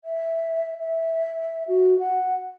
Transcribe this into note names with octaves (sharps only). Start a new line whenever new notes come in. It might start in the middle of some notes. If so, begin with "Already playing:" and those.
E5
E5
F#4
F#5